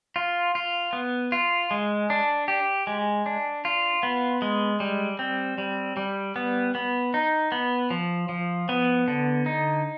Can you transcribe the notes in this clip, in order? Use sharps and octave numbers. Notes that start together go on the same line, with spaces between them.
F4
F4
B3
F4
G#3
D4
G4
G#3
D4
F4
B3
G#3
G3
C4
G3
G3
B3
B3
D#4
B3
F3
F3
B3
D3
D#4